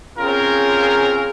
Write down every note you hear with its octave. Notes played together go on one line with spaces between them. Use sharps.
C4 C#4 F4 G#4 A#4